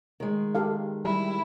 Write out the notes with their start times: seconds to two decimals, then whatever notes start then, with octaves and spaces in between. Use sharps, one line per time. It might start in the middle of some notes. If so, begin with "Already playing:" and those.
0.20 D#3 G#3
0.55 G4 A4 F5
1.05 G3 E4